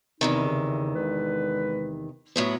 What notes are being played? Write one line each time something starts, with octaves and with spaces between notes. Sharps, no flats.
E2 C3 D#3 D#4 E4
C#3
D3 G#3 B4
A2 F#3 B3